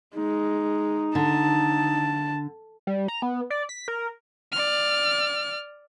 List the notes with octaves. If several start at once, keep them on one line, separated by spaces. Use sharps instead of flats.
G#3 D#4
D3 A5
G3
A#5
B3
D5
B6
A#4
D5 F6